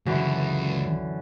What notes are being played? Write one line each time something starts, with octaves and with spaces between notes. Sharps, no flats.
C#2 F#2 D3 E3